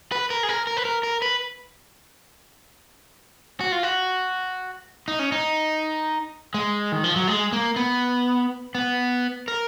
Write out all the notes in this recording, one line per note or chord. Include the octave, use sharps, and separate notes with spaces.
B4
A#4
G#4
A#4
A#4
B4
A#4
A#4
B4
F#4
F4
F#4
D#4
C#4
D#4
G#3
D#3
F3
F#3
G#3
A#3
B3
B3
A#4